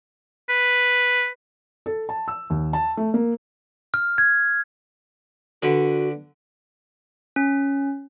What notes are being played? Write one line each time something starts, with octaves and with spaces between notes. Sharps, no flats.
B4
A4
A5
E6
D#2
A5
A3
A#3
F6
G#6
D3 F#4 B4
C#4